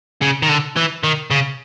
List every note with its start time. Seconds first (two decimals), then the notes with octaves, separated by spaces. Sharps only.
0.21 C#3
0.42 D#3
0.49 D3
0.76 E3
1.03 D#3
1.31 C#3